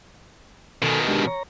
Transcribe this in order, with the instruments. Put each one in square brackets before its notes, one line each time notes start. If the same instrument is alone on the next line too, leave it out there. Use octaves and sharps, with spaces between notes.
[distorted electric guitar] B2 D#3 [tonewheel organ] A4 G#5
[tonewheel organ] G#3 D4 G4
C#5 A#5